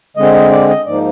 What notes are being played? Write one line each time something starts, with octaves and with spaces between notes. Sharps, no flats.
D3 G#3 C4 D#5
D#5
D5
D#5
G#2 F3 A#3 D#4 D5